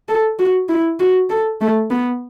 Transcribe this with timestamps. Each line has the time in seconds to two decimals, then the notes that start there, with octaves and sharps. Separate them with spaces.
0.09 A4
0.39 F#4
0.69 E4
1.00 F#4
1.30 A4
1.61 A3
1.91 B3